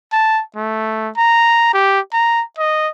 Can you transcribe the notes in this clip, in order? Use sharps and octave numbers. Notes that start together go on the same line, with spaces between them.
A5
A3
A#5
G4
A#5
D#5